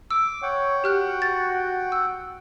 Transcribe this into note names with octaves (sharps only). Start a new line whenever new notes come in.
D6 E6
C#5 F#5 G5
F#4 G4 F6 F#6
A6
E6